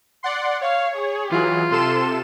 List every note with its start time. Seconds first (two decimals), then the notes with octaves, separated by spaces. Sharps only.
0.23 D5 F#5 C6
0.61 C#5 F5
0.96 G#4
1.31 E3 F#3 F4
1.71 C3 A4 C6 E7